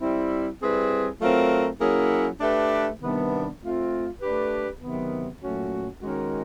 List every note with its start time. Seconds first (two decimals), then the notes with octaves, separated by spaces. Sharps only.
0.01 G3 C4 E4
0.60 G3 C4 E4 G#4 B4
1.21 F#3 A3 C4 F4 A#4
1.81 F#3 A#3 C#4 E4 G#4
2.40 A3 D4 G4 B4
3.01 C3 D#3 G3 B3 D4
3.60 A3 C4 F4
4.21 A3 D4 G4 B4
4.81 C3 D#3 F#3 B3
5.41 A#2 F#3 A3 C#4 F#4
6.01 D#3 G#3 C#4 F#4 A#4